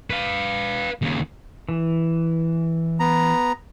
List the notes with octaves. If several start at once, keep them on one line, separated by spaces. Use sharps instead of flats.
B4 F5
D#2 C#3
E3
B3 A#5